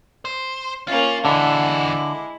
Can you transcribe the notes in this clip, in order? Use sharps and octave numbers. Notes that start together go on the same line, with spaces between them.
C5
A#3 C#4 F4
D3 E3 G#3 E4 F#4